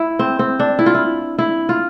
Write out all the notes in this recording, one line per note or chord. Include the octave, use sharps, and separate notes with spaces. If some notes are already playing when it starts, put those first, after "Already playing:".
Already playing: E4
C4
C4
D4
E4
F4
E4
E4
F4